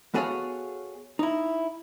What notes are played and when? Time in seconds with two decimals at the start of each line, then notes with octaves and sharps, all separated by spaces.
0.14 B3 F#4 G#4 A4 C#5 F5
1.19 D#4 E4